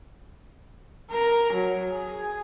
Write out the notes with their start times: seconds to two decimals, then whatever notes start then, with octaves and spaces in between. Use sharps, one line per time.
1.11 A#4
1.53 F#3
1.92 G#4